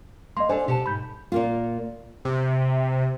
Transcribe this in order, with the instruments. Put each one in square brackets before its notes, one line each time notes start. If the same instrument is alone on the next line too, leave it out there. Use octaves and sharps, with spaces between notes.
[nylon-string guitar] A#3 [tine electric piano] D#5 C6
[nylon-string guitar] D4 A4 F5 [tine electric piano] C5 G#5
[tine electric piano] B2 [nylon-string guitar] G4 F#5 A5
[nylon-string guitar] G#2 [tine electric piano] B5 G6
[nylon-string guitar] A#2 A#3 F4
[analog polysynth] C3